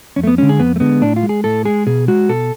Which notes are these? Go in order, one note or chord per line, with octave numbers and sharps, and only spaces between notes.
F2 C#4
A3
B3
D3 G#3 C#4
G#4
F2 B3
A3
D3 G#3 B3
A2 D4
F4
G#3
G#4
A2 A4
G#3 G#4
B2 G#4
G#3 F#4
B2 A4